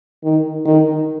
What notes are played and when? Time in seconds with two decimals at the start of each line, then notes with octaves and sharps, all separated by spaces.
0.24 D#3
0.65 D#3